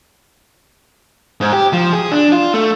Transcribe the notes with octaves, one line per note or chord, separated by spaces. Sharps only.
G#2
G4
F3
G#4
D4
F4
A3